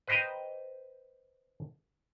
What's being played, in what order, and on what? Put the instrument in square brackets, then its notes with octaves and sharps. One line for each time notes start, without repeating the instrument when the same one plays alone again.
[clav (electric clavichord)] B4 C5 D#5 G5 A#5